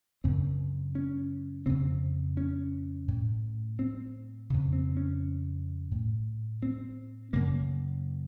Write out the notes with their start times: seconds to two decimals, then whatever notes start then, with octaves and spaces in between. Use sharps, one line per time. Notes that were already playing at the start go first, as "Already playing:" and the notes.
0.24 F#2 C#3 C4
0.95 C#4
1.66 F2 C#3 C4
2.37 C#4
3.08 A2
3.79 C4
4.50 F2 C#3
4.73 C4
4.97 C#4
5.91 A2
6.62 C4
7.33 F#2 C#3 A#3